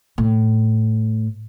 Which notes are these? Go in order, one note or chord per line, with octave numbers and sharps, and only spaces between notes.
A2